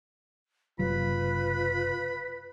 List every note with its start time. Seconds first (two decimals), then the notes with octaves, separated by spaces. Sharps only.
0.79 F#1 C3 F#3 F4 B4 B5